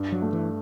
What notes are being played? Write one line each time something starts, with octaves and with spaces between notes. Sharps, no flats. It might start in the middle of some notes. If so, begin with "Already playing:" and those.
Already playing: G2
F#3
A3
E3